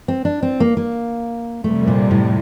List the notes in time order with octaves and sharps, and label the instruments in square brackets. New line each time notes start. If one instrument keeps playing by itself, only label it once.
[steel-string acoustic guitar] C4
D4
C4
A#3
A#3
[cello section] F2 C3 G3 [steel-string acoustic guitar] A3
[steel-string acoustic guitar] A#2
A2